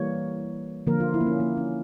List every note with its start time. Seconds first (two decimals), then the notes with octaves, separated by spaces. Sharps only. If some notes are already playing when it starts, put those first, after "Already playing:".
Already playing: E3 G3 A#3 C#5
0.87 D3 F3 A#3 A#4
1.00 F4
1.14 E4
1.21 A#3
1.27 C#4
1.40 A#3
1.57 C#4